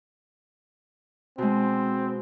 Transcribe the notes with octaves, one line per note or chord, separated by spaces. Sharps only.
B2 G#3 C4